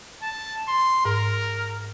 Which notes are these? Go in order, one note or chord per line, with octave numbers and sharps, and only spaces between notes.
A5
C6
G#2 A#4